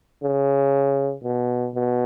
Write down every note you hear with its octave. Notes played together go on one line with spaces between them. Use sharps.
C#3
B2
B2